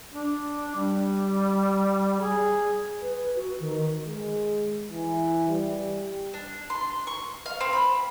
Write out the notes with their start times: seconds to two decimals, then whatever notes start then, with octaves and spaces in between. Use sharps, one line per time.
0.13 D4
0.75 G3
2.20 G#4
3.02 B4
3.35 F#4
3.60 D#3
4.07 G#3
4.90 E3
5.49 G3
6.34 D4
6.70 C6
7.07 C#6
7.46 F5
7.61 C4
7.73 B5